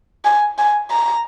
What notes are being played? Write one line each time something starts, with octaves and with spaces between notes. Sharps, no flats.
G#5
G#5
A#5